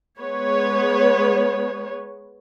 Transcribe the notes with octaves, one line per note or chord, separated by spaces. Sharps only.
G#3 B3 B4 C#5